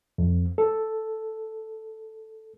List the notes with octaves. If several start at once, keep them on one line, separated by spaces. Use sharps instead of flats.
F2
A4